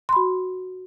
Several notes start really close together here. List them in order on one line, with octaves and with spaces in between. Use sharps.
C6 B5 F#4